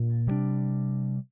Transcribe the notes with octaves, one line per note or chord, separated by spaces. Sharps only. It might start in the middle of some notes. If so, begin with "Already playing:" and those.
Already playing: A#2 D4
C3 G3 A#3 D4